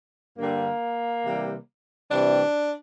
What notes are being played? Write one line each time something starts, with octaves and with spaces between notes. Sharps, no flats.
G2 D3 G3 A#3
C3 E3 G3
C3 E3 G3 D4